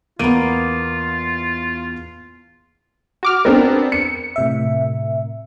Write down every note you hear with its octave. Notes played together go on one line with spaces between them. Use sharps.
E2 A#3 B3 F4 D7 D#7
F#4 D6 F6
B3 C4 D4 A#4
C#7
A2 C3 E5